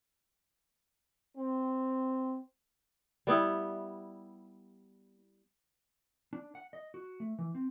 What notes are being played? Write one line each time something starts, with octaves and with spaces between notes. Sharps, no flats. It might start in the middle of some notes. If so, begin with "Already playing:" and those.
C4
G3 B3 E4
D4
F#5
D#5
F#4
A3
E3
C4